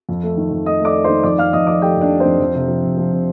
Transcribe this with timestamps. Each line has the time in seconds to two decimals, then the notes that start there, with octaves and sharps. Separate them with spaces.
0.09 F2
0.23 A3
0.37 D#3
0.51 F2
0.66 A3 D#5 D#6
0.81 A3 D5 D6
0.95 A3
1.04 D#3 C5 C6
1.23 F2 D5 D6
1.38 F2 F5 F6
1.53 F2 D#5 D#6
1.67 F3 D5 D6
1.82 A3 G4 G5
1.97 F2 D4 D5
2.11 A3
2.20 C4 C5
2.26 F2
2.39 F2
2.55 C3
2.68 F3
2.83 F2
2.97 F3
3.12 C3